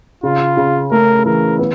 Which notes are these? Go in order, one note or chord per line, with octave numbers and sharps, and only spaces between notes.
C#3 F4
C#3
A3 A#4
E3 A#4
B3